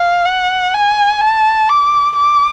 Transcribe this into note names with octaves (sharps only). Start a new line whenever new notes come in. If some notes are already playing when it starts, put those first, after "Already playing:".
Already playing: F5
F#5
G#5
A5
D6
D6